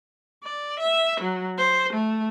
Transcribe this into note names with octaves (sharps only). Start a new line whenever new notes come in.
D5
E5
F#3
C5
A3